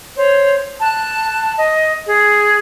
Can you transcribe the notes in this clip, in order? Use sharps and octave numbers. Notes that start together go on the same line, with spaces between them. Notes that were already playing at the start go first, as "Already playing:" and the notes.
C5 C#5
A5 F#6
D#5
G#4